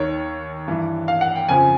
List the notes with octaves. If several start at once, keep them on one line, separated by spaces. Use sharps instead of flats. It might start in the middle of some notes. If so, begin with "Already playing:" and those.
Already playing: D#2 D#3 C#5
G2 E3
F5
F#5
G5
F2 C#3 F3 G#5